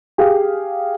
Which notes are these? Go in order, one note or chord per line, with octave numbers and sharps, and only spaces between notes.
G4 G#4 F5